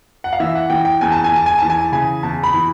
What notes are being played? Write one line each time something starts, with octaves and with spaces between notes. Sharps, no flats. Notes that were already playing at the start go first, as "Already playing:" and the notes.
F#5
F5
E3 E5
F#5
E3 G5
G5
E2 G#5
A5
G#5
E2 A5
G#5
E3 A5
G#5
A5
C#3 G#5
E2 A5
B5
E3